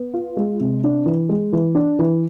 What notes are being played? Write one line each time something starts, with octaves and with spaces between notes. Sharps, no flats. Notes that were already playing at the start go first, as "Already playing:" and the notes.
Already playing: B3
F4
G#3
C3
D4
E3
G#3
E3
D4
E3